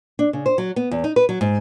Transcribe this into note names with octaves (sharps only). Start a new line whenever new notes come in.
D4
C#3
C5
F#3
B3
E2
D#4
B4
F#3
G#2